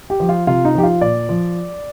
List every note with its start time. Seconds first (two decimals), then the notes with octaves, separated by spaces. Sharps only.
0.10 G4
0.20 F3
0.29 F4
0.47 C3 F4
0.65 D#4
0.75 F3 G4
0.83 F4
1.01 A#2 D5
1.29 F3